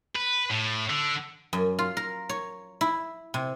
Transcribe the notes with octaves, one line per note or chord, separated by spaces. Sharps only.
B4
A2
D3
F#2
F4
A#4
C#5
E4
C3